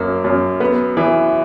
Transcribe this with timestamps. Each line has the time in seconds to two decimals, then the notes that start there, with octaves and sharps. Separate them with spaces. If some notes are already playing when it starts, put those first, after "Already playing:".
Already playing: F#2 A#3
0.24 F#2
0.60 B3
0.97 E3